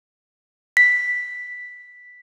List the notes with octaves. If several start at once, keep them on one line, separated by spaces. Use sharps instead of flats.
B6